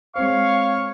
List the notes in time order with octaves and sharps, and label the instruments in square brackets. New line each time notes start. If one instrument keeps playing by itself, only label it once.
[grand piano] G#3 C4 C5 [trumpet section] C#5 C#6 [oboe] F5